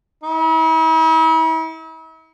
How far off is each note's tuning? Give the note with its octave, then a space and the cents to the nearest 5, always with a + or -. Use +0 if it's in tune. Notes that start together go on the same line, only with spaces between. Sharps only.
E4 -45